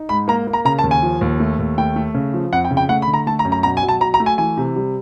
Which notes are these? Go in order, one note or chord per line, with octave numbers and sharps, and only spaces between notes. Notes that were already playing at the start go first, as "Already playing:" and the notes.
Already playing: D#4
G#2 B5
A#3 A#5
A#3
A#5
C#3 A#5
A5
D#2
G#5
F3
D#2
A3
D#2
A3 G5
A3
C#3
F3
F2 F#5
G5
C#3
G5
A3 F#5
B5
D3
A#5
A3 A5
A#5
F#2
A#5
B2 A#5
G#5
F#3
A5
F#3 A#5
A#5
A3
G#5
E3 G#5
C3
G3